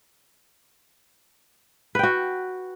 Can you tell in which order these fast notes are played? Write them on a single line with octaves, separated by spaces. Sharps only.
B4 G5 F#4